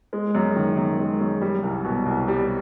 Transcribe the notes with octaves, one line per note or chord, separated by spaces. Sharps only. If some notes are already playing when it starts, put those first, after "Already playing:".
G#3
F#2
D#3
F#2
G#3
F#2
G3
C2
B2
C2
G3